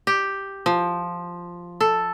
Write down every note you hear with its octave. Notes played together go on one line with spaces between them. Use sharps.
G4
F3
A4